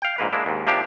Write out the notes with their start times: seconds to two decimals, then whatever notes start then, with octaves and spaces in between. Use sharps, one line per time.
0.02 F5 G5
0.18 A#1 G#2 A#3 B4
0.33 G#3 A#3 D4 E4
0.46 D#2 G#2
0.67 C3 F3 A#3 D4 G4 F5